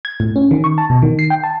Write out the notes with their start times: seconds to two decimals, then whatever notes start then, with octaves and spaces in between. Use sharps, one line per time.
0.05 G#6
0.20 A2
0.36 C#4
0.51 D#3
0.64 C#6
0.78 A5
0.90 B2
1.02 D#3
1.19 C7
1.30 G5
1.44 A5